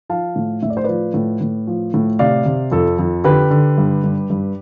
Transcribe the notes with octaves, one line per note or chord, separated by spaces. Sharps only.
F3 F5 A5
A2
A2 E5
D5
C5
F3 B4 D5
A2
A2
F3
A2
C3 D5 F5
C3
F2 A4
F2
D3 G4 B4
D3
G2
G2
G2